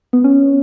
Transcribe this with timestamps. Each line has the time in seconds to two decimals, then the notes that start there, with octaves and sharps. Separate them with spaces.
0.13 B3
0.24 C#4